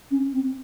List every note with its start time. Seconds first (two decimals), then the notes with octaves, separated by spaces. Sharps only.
0.11 C#4
0.33 C4